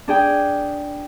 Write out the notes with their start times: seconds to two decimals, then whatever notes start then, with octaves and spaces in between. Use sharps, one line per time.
0.08 D4 G#4 G5